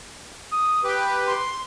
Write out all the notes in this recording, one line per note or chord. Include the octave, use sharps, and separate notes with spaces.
D#6
G4 B4 G5
C6